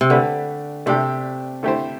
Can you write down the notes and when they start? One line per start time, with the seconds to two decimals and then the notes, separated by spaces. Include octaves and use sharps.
0.01 C3
0.10 D3 A3 D4 G4 B4
0.86 C3 A3 D4 G4
1.63 D3 A3 E4 G4 C5